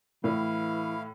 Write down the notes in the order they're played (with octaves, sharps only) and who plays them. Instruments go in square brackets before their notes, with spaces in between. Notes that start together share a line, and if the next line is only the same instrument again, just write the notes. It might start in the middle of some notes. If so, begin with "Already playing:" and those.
[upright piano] A2 [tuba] E3 [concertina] E4 F5